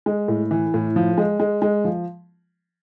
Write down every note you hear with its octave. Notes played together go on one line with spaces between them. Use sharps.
G#3
A2
E3
A2
F3
G#3
G#3
G#3
F3